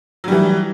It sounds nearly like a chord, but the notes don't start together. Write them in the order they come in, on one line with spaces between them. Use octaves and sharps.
F#3 G3 E3